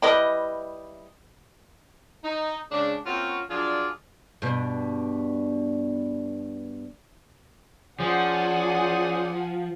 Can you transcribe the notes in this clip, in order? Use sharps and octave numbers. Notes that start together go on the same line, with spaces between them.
G3 E4 B4 D#5
D#4
C#3 G#3 C#4 D4
A#3 C4 C#4 F4 F#4
F3 F#3 D4 F4 G#4 D5
G2 B2
F3 C#4 G#4 C5 D5 F#5 G#5